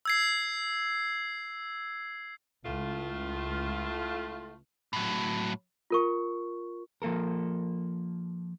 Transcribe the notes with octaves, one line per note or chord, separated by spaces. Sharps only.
E6 G#6 C7
C#2 A2 A3 F4
A2 F#3
F4 A#4 C#6
F3 A#3 A4 A#4